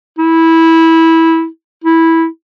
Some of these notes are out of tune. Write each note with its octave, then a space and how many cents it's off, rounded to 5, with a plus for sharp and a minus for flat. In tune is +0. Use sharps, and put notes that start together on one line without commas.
E4 -15
E4 -10